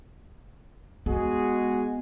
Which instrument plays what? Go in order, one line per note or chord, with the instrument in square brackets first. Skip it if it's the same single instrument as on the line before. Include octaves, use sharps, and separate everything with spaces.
[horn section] G#3 F#4 G#4 [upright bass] B3